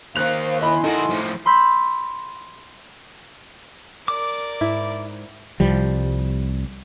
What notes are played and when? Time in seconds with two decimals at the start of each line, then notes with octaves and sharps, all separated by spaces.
0.16 D#2 D#3 C5 F5 F#6 F7
0.61 E4 D#5 G#5 B5 C6
0.83 D#3 D#4 F#4 A4
1.10 A2 F3
1.45 B5 C6 E6 G6 B6
4.08 A#4 D5 D6
4.61 G#2 E4
5.60 C2 F3 G3